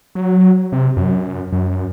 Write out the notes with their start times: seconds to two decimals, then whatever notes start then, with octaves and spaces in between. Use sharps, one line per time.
0.15 F#3
0.72 C3
0.97 F#2
1.52 F#2